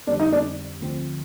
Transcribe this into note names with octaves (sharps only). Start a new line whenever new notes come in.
F2 D3 G3 C4 D4
D#4
D4
D2 D3 F3 C4